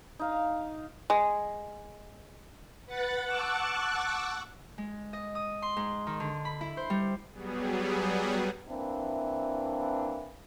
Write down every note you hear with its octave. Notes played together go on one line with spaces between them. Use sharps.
D#4 F5
G#3
B4 F#5 F#6 A6
F#5 A5 C#6 D6 E6 F#6
G#3
D#5
D#6
C6
G#2
D#3
D3
B5
E4
C5
G3
F#3 G3 B3 G#4
E3 A#3 C4 D4 E4